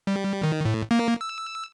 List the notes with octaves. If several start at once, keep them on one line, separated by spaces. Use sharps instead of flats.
G3
D#3
A2
A#3
E6